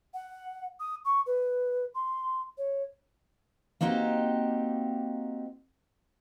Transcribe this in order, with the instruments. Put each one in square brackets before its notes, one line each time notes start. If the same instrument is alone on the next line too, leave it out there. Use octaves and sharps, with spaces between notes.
[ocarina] F#5
D#6
C#6
B4
C6
C#5
[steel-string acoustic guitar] A#3 C4 D#4 F#4 G4